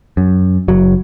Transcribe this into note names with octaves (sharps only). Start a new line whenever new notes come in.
F#2
F#1 F#3